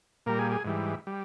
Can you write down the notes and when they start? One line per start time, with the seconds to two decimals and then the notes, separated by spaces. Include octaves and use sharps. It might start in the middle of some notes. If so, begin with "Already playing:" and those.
0.26 A#2 G3 A#4
0.39 G#4
0.52 G#4
0.65 G#2 E3 G3
1.07 G3